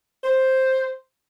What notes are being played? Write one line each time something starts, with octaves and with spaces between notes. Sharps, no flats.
C5